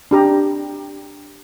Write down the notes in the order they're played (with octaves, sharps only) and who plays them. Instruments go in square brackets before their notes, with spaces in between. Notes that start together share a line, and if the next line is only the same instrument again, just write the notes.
[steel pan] D4 G4 A#5